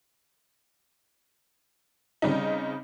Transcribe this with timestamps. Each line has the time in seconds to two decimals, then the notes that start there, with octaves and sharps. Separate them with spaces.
2.22 C#3 G3 C4 D#4